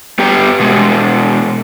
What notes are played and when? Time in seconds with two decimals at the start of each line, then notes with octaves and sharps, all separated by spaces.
0.19 G2 B3 G4 G5 A#5
0.59 B2 G#3